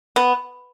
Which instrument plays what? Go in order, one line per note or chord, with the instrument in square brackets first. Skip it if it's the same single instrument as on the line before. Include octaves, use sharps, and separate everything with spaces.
[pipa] B3